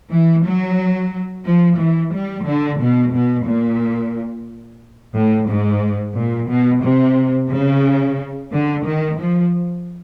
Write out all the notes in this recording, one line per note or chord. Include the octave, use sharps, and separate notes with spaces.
E3
F#3
F3
E3
G3
D3
B2
B2
A#2
A2
G#2
A#2
B2
C3
C#3
D3
D#3
F3